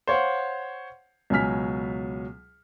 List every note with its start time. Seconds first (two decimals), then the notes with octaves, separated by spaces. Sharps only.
0.07 C5 C#5 F5 F#5
1.30 C#2 B2 F#3 G#5 F6 B6